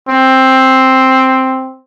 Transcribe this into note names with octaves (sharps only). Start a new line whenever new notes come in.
C4